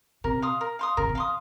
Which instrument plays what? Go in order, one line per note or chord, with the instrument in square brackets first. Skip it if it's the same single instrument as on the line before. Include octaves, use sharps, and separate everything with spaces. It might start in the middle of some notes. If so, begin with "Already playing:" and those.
[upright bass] C3 [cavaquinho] A#4
[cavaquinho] F5 C6 D#6
A#4
F5 C6 D#6
[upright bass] C#3 [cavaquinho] A#4
[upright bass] C3
[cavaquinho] F5 C6 D#6